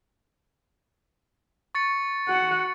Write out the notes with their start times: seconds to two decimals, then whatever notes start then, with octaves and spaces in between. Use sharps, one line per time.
1.75 C#6 A6 C#7
2.28 F#4 F#5